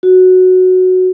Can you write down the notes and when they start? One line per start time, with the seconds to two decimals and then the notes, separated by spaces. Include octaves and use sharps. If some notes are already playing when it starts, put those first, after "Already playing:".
0.03 F#4